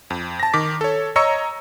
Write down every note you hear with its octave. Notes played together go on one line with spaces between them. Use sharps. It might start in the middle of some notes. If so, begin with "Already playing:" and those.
F2
A5 A#6
D#3 D6 B6
A4 C#5
C#5 D#5 A#5 C#6 E6 C#7